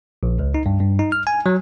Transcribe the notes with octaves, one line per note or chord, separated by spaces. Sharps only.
A#1
C#2
D#4
G2
G2
D#4
F6
G#5
F#3